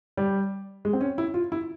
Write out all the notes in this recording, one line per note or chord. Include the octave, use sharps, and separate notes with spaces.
G3
G#3
C4
C#4
E4
F4
E4